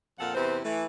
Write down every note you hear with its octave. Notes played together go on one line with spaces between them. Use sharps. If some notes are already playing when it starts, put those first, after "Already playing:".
F2 A#2 A4 F5 F#5
E2 C3 C4 E4 B4 C5
E3 A3